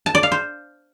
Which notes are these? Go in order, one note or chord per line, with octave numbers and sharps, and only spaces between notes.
A5
D5
F5
C5